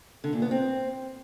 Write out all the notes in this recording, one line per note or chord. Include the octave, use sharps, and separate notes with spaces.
D3
A#2
B3
C4